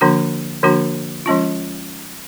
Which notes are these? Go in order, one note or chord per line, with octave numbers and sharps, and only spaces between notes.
D3 F3 A#3 D4 F#4
D3 F3 A#3 D4 F#4
F3 G#3 C#4 F4